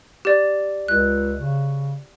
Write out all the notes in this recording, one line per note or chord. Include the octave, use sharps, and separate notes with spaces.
G4 D5
C#2 F#6
C#3